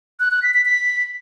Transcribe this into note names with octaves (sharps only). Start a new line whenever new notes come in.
F#6
F#6
B6
B6
B6